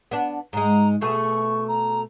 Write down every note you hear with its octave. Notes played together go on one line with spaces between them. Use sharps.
B3 D4
G#2 G#3 A#5
B2 A3 G#4 C#6
A#5